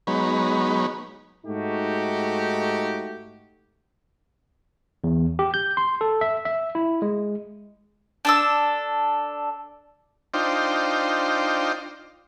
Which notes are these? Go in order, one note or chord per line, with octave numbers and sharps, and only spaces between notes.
F#3 G#3 B3 D#4 C#5 B5
G#2 A3 D#4 F#4 G4
E2
G4
G6
C6
A4
E5
E5
E4
G#3
D4 A4 E6
D4 D#4 F4 C5 G5